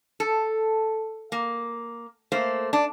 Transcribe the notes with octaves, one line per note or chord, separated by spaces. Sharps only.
A4
A#3
A3 A#3 C5
D4